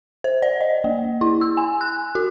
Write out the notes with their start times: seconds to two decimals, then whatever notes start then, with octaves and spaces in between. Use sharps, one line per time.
0.24 C5
0.42 D5
0.61 D#5
0.84 A#3
1.21 E4
1.41 E6
1.57 G#5
1.81 F#6
2.15 F#4